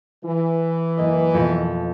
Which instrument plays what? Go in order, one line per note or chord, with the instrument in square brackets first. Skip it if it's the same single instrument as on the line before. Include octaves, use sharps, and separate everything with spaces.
[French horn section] E3
[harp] F#1 A#3 D#5
F2 B2